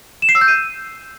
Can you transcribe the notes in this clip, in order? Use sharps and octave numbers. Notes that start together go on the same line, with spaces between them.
E7
C7
E6
G6
D#7